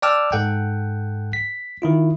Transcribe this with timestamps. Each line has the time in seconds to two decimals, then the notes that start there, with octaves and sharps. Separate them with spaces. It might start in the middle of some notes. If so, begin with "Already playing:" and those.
0.02 D5 G5 A5 D6 E6 F6
0.32 G#2 A4 F#5 G5
1.33 B6
1.82 D#3 E4 F4